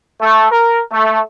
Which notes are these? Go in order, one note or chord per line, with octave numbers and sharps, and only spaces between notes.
A3
A#4
A3